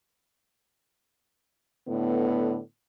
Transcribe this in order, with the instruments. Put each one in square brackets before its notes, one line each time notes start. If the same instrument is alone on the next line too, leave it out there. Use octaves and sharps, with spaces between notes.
[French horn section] A2 D3 B3